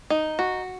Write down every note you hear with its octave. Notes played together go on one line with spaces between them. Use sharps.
D#4
F#4